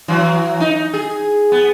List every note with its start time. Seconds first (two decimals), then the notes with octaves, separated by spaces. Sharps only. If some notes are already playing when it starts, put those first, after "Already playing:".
0.08 E3 F#3
0.60 D#4
0.94 G#4
1.52 B3